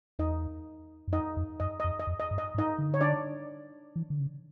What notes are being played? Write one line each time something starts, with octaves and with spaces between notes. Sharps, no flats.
E2 D#4 D#5
F#2
F2 D#4 D#5
F2
F#2 D#5
F2 D#5
D#5
F2
D#5
G2
D#5
G#2
D#4 D#5
D3
C#5
D4 D5
E3
D3
C#3